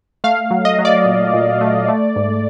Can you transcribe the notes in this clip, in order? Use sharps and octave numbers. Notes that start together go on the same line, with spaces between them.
A3 F5
F#3
D#5
F#3
D5
A#2
A#2
A3
A3
G#2